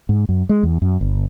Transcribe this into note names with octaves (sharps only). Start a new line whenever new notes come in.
G#2
F#2
G#3
E2
F#2
G1